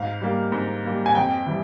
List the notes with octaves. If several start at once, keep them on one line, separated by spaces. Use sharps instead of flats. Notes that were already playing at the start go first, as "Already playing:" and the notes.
Already playing: G#2 F5
G3 A#3
G#2
G3 A#3
G#5
F2 G5
E3 G3